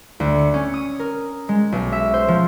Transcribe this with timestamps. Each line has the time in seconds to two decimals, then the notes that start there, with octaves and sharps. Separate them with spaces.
0.20 D2
0.39 C#7
0.54 C#4
0.74 D#6
1.00 A#4
1.49 G#3
1.72 B1
1.92 E5
2.14 C5
2.28 F3